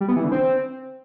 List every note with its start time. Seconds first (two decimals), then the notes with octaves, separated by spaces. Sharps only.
0.01 G3
0.08 B3
0.16 E3
0.24 D3
0.32 C4